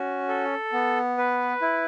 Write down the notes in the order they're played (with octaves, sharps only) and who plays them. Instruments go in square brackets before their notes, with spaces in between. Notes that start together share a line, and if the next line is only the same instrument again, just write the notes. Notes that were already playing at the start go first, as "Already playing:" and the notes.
Already playing: [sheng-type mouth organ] C#4 F#4
A4
B3
B4
E4